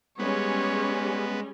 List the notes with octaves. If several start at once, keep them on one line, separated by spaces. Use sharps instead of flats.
G3 G#3 B3 C#4 G#4 C#5